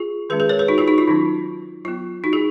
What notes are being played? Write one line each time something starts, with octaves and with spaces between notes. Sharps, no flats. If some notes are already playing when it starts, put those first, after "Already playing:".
Already playing: F4 G#4
D#3 G#3 C#4 G#4 B4
G#4 B4
A#4 C#5
G#4 B4
D#4 F#4
F4 G#4
D#4 F#4
F4
D#3 F#3 C#4 D#4
F#3 B3 F4
D#4 F#4
F4 G#4